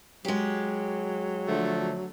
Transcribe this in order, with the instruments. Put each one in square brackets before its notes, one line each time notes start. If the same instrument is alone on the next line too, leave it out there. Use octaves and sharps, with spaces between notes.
[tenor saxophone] F#3 [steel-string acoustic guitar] G#3 G4
[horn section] D3 F3 A3